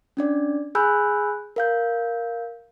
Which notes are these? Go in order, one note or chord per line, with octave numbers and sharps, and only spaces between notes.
C#4 D4 D5
G#4 G#5 B5 E6 F#6 G6
A#4 F5 G6